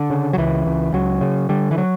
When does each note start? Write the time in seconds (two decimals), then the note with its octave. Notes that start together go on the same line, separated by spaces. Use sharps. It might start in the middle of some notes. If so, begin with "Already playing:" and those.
Already playing: D3
0.10 C#3
0.33 F#3
0.38 C#2 E3
0.66 C#2
0.93 C#2 F#3
1.21 C#3
1.49 D3 G3
1.71 E3
1.78 F#3